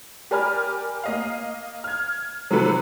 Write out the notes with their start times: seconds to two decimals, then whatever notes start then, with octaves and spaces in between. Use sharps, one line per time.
0.31 G4 A#4 D5 G#5 B5 F6
1.04 A#3 D#5 F5
1.84 F6 G#6
2.51 C3 D#3 F3 F#3 A4 B4